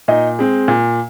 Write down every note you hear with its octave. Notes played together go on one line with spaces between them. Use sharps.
A#2 D#4 D#5
G#3 C4
A#2